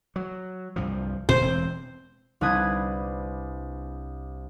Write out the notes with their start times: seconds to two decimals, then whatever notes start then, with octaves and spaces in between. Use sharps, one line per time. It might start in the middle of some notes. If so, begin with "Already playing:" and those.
0.16 F#3
0.76 C2 G2 F3
1.29 A#2 C5
1.41 E1 C4
2.41 C2 D4 B4 D#6 G#6